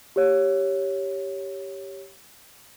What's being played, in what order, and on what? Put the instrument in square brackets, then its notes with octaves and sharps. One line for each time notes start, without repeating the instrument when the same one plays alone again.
[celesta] G4 C#5